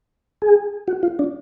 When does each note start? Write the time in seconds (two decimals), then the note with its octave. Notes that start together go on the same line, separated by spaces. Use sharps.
0.42 G#4
0.88 F#4
1.03 F4
1.19 D4